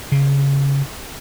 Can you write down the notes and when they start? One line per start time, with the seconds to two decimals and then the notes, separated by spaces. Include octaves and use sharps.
0.12 C#3